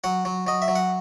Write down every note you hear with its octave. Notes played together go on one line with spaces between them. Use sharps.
F#3 F#5
F#3
F#3 D#5
E5
F#3
F#5